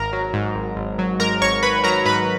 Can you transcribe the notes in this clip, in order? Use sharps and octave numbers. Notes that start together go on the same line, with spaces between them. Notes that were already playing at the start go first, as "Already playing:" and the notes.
Already playing: G#1 A#4 A#5
F#3
G#2
G#1
G#1
F#3
G#2 A#4 A#5
G#1 C#5 C#6
G#1 B4 B5
F#3 A#4 A#5
G#2 B4 B5